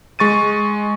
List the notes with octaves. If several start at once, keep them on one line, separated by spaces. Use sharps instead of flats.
G#3 C#6 A6 D#7